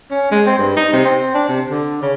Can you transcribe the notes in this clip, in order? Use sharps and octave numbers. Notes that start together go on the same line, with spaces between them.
C#4
G#3
C4
G2
D#4
C3
C4
D4
C3
D3
C#3